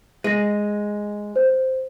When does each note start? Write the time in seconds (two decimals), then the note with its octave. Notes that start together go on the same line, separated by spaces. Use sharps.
0.24 G#3 A#6 D#7
1.36 C5